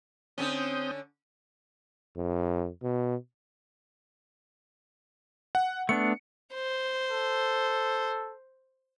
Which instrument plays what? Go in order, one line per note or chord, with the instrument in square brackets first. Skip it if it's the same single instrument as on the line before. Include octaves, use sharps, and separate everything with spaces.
[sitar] D3 C#4 [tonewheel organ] C4 D#6 G6
[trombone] F2
B2
[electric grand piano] F#5
[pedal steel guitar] A3 B3 D4 [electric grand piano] C#7
[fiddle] C5
[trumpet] A4